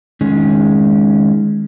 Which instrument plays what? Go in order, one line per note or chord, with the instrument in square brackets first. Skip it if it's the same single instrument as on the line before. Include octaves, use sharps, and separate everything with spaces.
[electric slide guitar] D#3 G#3 C#4